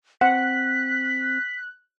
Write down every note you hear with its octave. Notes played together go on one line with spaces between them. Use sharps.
C4 F#5 F#6 B6